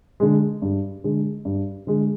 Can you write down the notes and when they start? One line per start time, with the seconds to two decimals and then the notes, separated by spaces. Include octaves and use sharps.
0.20 D3 G#3
0.62 G2
1.04 D3 G#3
1.45 G2
1.87 D3 G#3